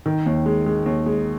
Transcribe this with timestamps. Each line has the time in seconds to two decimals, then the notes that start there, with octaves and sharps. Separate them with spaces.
0.06 D#3
0.26 D#2
0.46 G#3
0.66 G#3
0.86 D#2
1.06 G#3